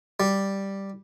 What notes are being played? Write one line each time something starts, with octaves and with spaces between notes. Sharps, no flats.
G3